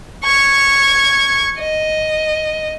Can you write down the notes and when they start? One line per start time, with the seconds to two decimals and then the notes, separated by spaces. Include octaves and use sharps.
0.24 C#6 G#6
1.59 D#5